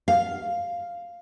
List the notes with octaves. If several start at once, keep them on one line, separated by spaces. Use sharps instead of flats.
F5